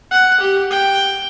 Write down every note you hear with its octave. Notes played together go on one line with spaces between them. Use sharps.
F#5
G4
G5